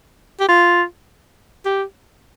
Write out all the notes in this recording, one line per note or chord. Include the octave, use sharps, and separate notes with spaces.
G4
F4
G4